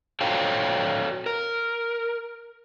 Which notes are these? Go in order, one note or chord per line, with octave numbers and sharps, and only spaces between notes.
F#4 A4 C#5 F5 G5
A#4